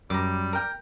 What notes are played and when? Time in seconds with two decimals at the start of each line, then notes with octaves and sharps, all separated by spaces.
0.10 F#2 G3 A#5 D6
0.53 A#4 G5